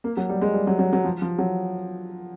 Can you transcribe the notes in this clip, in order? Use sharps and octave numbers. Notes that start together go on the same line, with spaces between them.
A#3
F#3
G3
G#3
G3
F#3
F#3
F#3
F3
F3
F#3